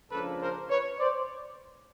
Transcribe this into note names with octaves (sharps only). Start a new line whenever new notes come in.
C#2 C#3 F3 A#3 D4 A4 B4
A#4 C5
B4 C#5
C5 D5